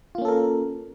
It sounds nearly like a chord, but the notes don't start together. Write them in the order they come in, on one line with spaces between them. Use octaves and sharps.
F4 A#3 C#4 A4 A#4